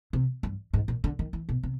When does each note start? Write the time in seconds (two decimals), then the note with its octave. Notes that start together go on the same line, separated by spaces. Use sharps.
0.13 C3
0.43 G2
0.73 G#2
0.88 A#2
1.04 D3
1.19 D#3
1.33 E3
1.49 B2
1.63 C3